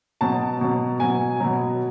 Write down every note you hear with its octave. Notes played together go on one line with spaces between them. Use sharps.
B2 F#3 A5
B2 F#3
B2 F#3 G#5
B2 F#3